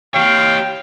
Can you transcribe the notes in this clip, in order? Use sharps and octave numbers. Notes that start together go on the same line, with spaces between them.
G4 C#5 F5 G5